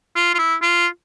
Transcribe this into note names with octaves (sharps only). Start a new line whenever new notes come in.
F4
F4
E4
F4